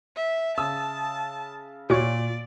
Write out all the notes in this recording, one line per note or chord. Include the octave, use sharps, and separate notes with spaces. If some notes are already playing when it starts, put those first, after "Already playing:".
E5
C#3 A5 D#6 E6
A#2 F#4 C#5 D5